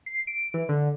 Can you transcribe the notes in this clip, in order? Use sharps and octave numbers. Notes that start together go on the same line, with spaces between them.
C7
D7
E3
D3